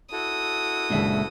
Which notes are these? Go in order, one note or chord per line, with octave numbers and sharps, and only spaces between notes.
E4 F#4 A4 D#6
F#1 A#2 G#3 D4 E5